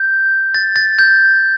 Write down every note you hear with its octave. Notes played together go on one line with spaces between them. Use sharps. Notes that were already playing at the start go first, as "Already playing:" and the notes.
Already playing: G6
A6
A6
G6